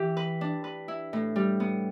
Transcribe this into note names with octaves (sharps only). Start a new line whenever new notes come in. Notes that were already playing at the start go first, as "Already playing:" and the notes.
Already playing: E3 E4 G4
B4
D4
B4
E4
A2
G3
B3